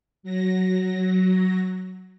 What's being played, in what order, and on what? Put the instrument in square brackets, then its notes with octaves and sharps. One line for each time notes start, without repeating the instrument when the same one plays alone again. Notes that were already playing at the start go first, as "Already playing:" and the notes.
[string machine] F#3 A#6